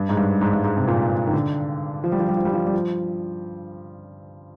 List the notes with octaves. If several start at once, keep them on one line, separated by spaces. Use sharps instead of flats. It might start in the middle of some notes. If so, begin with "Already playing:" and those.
Already playing: G2
G#2
G2
G#2
G2
G#2
C3
A#2
D#3
D3
F3
G3
F3
G3
F3
G3
F3
G3
F3